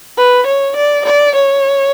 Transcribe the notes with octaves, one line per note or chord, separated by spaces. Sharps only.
B4
C#5
D5
D5
C#5